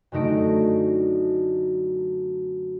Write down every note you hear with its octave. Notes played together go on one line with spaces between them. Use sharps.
F#2 D3 A3 D#4 A#6 D7